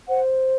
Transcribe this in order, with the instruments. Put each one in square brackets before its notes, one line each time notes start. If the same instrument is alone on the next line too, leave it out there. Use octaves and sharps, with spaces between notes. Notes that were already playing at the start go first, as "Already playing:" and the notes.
[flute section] C5 F#5